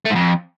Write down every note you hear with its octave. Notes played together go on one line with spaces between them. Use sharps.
A3
G#2
F2